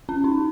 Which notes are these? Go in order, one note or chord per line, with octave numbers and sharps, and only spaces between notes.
C#4
D#4